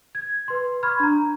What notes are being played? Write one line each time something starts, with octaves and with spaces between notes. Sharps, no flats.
G#6
B4 C6
B5 C#6 F6 G#6
D4 A#5